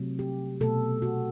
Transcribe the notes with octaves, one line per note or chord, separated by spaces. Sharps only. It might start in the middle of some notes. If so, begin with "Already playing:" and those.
Already playing: C3 F#3 A3
G4
B2 A3 A4
F#4